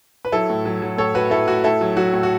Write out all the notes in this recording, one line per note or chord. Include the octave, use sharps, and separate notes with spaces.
B4
F#3 E4 A4
A2
F#3
F#3
A2 A4 C#5
A2 F#4 B4
A2 E4 A4
A2 F#4
A2 E4 A4
F#3
F#3 F#4
A2
F#4